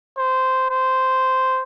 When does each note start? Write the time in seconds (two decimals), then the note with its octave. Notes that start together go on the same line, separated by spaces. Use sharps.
0.18 C5
0.70 C5